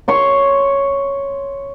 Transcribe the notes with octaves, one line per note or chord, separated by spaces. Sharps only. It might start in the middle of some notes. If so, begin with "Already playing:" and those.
C#5 C6 C#6